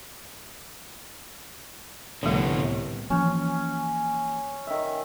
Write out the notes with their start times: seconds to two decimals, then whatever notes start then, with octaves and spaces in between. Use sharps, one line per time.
2.23 C2 A2 D3 F3 A3 B3
3.10 E3 F3 A#3 C#4
4.67 D#3 E5